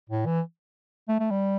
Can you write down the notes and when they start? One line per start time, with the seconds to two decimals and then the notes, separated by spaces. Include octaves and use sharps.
0.10 A2
0.26 E3
1.08 A3
1.19 A3
1.31 G3